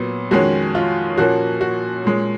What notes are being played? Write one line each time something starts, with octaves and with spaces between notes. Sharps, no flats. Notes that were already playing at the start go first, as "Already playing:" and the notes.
Already playing: A#2 F#3 B3
F2 D#3 G#3 C#4 F#4
F4
A#2 F3 A#3 C#4 F#4
F#4
A#2 G#3 C#4